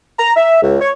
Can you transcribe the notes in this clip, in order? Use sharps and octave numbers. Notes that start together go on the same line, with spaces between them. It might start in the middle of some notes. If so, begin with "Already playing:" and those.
A#5
E5
C#2
C#5